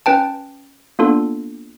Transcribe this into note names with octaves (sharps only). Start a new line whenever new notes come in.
C#4 B4 G5 A5
A#3 B3 D4 F4 A4